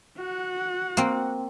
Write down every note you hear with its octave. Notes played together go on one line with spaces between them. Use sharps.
F#4 F#5
A#3 C4